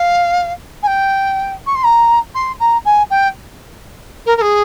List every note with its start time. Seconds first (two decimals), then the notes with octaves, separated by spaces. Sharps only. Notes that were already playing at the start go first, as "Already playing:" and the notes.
Already playing: F5
0.82 G#5
0.87 G5
1.66 C#6
1.75 C6
1.84 A#5
2.34 C6
2.60 A#5
2.85 G#5
3.10 G5
4.26 A#4
4.37 A#4
4.41 G#4